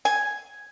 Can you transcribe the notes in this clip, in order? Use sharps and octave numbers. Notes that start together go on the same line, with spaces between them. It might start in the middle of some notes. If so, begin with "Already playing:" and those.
G#5